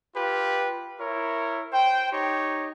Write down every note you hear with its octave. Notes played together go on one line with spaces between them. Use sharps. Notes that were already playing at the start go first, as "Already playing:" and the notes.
F4 G4 B4
E4 A#4 C#5
C5 G5
D#4 G4 C#5